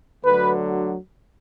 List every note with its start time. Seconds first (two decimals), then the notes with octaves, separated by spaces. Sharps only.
0.24 D2 D3 F#3 B4